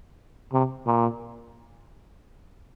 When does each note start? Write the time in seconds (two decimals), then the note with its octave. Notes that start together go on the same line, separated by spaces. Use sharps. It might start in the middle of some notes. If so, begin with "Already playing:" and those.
0.53 C3
0.87 A#2